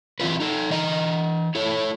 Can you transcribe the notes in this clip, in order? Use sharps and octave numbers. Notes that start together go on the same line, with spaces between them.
E3 C4 E4 F4 B4
D#4 A4
E3 D#5 A#5
E4 A4 C#5